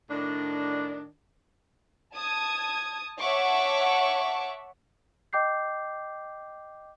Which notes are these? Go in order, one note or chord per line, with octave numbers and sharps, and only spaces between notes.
A2 D#3 D4
A5 D#6 G#6
C#5 E5 F#5 A5 C#6 D6
D#5 G5 D6 G6 C7